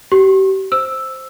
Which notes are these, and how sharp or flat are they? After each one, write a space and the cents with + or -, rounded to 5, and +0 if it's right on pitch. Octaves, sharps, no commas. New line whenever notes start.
G4 -35 C#6 -40
C5 +0 E6 +0